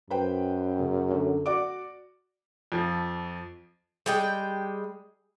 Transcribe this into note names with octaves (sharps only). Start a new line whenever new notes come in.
F#2 B4 C5 G5
C#3
D3
F#4 D5 D6
F2 F3
G3 G#3 G5